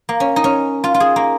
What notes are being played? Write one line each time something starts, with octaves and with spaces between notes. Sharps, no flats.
A#3
C#4
D#4
C#4
F4
F4
G#4
A#3